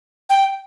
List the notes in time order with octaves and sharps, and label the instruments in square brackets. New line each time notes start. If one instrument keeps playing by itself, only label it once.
[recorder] G5